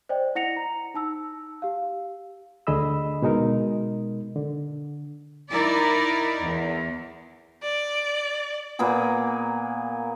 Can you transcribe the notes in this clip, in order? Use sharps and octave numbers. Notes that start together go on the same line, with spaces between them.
C5 D5 D#5 G5
E4 F#5 A#6 C#7 F7
A#5
D#4 A5 E6
G4 F5
D2 D3 G#4 D#5 B5 E6
B2 G#3 D#4 A#4
D3
D#4 E4 A#4 D5
E2
D5
A#2 A#3 B3 G#4